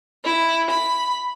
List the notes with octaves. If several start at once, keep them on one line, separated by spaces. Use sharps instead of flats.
E4
B5